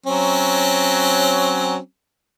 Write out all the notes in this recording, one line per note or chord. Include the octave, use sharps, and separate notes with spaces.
F#3 C4 C#4